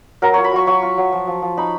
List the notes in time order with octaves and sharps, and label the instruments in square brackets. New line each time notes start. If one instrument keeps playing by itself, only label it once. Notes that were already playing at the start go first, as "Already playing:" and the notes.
[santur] F#3 A#4
F4 C#5
B5
F#3 C#6
F#3 C#6
F4
F#3
F3
F3
F3
D#4 B5